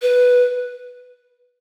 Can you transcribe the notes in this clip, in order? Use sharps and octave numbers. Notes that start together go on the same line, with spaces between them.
B4